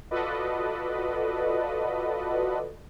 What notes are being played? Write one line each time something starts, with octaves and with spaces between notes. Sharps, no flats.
F4 F#4 A4 B4 D5 D#5